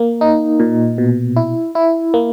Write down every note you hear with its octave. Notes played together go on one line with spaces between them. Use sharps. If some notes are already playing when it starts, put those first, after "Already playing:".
Already playing: A#3
D#4
A#2
B2
E4
E4
A#3